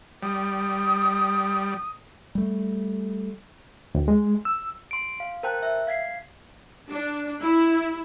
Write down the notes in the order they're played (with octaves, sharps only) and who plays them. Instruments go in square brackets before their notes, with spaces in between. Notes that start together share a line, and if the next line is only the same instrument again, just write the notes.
[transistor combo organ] G3 [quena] D#6
[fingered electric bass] G3 A3
[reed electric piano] D2
G#3
E6
[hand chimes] C6 D7
F5
A#4 C5 G5 A5 F#6
E5
F5 G#6 B6 C7
[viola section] D4
E4